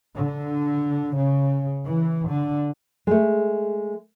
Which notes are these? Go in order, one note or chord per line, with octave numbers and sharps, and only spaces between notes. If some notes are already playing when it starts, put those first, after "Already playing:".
D3
C#3
E3
D3
G#3 A3